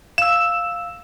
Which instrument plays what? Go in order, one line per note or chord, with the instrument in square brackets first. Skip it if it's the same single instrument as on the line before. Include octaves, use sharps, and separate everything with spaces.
[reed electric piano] F5 E6 [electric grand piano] E7